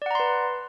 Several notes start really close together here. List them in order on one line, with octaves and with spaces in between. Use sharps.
D5 F#5 A#5 C6 B4